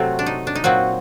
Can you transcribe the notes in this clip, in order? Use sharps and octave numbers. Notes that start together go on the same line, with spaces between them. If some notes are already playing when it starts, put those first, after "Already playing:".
Already playing: C3 F#3 A3 C4 F#4
D4
D#4
D4
D#4
A#2 F#3 C4 F#4